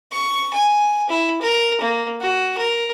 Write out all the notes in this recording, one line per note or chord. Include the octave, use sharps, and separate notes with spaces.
C#6
G#5
E4
A#4
A#3
F#4
A#4